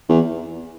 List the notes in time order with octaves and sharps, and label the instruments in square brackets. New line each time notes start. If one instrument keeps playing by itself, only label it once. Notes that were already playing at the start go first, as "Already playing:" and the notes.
[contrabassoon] E2